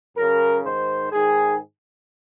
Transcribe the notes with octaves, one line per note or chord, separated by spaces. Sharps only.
F#2 C#3 A#4
G#2 D#3 C5
G#2 D#3 G#4